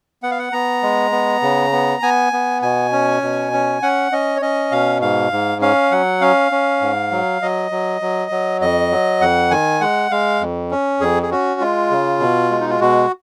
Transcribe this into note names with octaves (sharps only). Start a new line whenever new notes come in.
B3 F#5
F5
F#5
B3 A#5
G#3
B3
C#3
B3
B3 G#5
B3
B2 G#5
C#4
B2
C#4
C#4 F#5
C#4 D#5
C#5
C#4 D#5
B2 F5
G#2 F5
G#2
C#4 F5
F#3 F#5
C#4 F5
C#4
G#2
F#3
F#3 D#5
F#3
F#3
F#3
F2 D#5
F#3
F2 F#5
D#3 G#5
G#3 F#5
G#3 F5
F2
C#4
F2 G#4
G#4
C#4 F#4
G#3 F4
C#3
B2
G#3
D#4
F4
B2 F#4